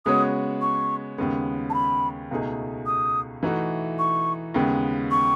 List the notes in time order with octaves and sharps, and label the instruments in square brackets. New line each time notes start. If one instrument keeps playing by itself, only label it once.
[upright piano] C#3 G#3 B3 F#4 C#5 [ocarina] D#6
[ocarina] C#6
[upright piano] D#2 C#3 G#3 B3
[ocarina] A5
B5
[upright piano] C#2 B2 A3 D#4 G#4
[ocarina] D#6
[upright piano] E3 A3 D#4 F#4
[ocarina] C#6
[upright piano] D#2 C#3 G#3 B3
[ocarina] C#6